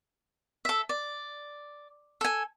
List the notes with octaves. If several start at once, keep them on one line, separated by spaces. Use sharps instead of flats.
A4 E5
D5
A4 G#5